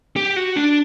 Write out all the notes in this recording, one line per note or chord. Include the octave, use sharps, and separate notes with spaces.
G4
F#4
D4